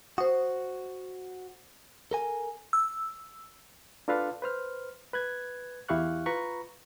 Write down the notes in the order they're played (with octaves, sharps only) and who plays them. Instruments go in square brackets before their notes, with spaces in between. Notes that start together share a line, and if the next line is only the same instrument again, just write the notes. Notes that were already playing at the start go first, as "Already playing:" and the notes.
[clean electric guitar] F#4 [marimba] C5 D#6
[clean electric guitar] A4 A#4 G#5
[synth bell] E6
[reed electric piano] D4 F4 A4 B4 F5
B4 C5 F6
B4 F#6 G#6
E2 E4 G4 F5 C#6 F#6
F4 B4 A#5 B5 C#6